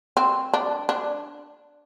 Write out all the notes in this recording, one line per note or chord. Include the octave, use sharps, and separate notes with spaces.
C4
D4
D4